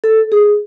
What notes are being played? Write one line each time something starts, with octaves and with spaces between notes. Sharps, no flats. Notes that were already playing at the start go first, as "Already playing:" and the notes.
A4
G#4